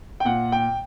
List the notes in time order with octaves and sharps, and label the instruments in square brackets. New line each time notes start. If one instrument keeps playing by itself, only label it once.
[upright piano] G5
A#2 F#5
G5